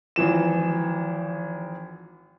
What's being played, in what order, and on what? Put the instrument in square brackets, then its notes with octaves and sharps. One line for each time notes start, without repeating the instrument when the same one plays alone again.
[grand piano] G#1 E3 F3 E7